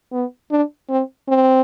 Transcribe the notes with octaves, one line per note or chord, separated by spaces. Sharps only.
B3
D4
C4
C4